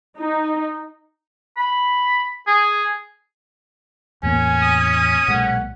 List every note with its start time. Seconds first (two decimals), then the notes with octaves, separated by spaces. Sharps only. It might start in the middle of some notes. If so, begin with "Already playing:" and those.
0.19 D#4
1.57 B5
2.47 G#4
4.23 E2 A2 A#3 C#4 G#5
4.61 D#6
5.28 B1 A#2 G#3 F#5